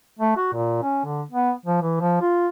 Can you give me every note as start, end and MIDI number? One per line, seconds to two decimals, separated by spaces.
0.19 0.35 57
0.36 0.50 66
0.53 0.78 46
0.82 1.01 61
1.05 1.23 50
1.31 1.52 59
1.66 1.82 53
1.82 2.00 52
2.00 2.18 53
2.21 2.48 65